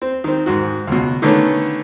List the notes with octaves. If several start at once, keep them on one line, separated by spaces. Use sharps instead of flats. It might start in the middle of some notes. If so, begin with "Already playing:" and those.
C4
D#3 C4
G#2 D#3 F#4
C#2 B2
D3 D#3 A3 B3 C#4